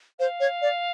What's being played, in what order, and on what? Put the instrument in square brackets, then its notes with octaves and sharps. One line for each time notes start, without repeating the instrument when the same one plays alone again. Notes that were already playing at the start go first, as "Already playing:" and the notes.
[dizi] C5 [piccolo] F5
[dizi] C#5
D5